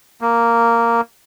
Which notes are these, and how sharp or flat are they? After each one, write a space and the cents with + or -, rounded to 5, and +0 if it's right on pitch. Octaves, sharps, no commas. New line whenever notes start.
A#3 -5